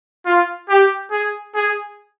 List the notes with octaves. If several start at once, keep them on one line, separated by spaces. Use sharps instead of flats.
F4
G4
G#4
G#4